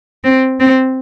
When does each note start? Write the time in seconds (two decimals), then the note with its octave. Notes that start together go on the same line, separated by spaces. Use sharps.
0.24 C4
0.60 C4